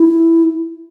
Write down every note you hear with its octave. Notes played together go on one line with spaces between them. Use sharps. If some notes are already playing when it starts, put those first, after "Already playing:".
Already playing: E4